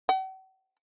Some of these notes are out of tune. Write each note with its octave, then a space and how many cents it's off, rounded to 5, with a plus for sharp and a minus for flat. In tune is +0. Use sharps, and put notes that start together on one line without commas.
F#5 +45